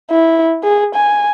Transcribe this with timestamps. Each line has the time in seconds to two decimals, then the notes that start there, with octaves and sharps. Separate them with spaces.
0.10 E4
0.64 G#4
0.95 G#5